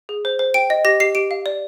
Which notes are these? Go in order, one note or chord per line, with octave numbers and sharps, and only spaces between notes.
G#4
C5
C5
G5 D7
D#5
G4 A#6
G4 C7
G4 D7
F5
D5